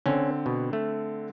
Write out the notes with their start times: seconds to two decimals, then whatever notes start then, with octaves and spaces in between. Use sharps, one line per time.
0.06 D3 C4 C#4
0.46 B2
0.73 A3